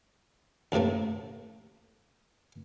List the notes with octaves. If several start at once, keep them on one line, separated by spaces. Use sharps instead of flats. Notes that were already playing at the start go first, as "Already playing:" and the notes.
D2 A2 C3 A3 A#3